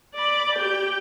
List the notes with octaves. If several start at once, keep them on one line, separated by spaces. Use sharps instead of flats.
D5 B5
G4 G5